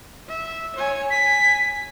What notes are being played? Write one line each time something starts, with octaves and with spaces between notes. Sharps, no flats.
E5
C#5 G#5
G#5 B6